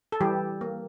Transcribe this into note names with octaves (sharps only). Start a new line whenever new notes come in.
A4
E3 G3 G4
A#3